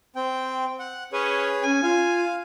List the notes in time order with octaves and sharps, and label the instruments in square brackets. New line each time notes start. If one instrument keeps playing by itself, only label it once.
[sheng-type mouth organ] C4 G5
F#5
[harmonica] C#4 [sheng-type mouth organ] G#4 B4 C#5
[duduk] C#4 [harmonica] G#5
[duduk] F4 [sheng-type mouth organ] F5